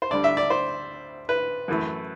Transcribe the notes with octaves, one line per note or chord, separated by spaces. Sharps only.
C5
D2 D3 G3 D5
E5
D5
C5
B4
F#2 E3 A3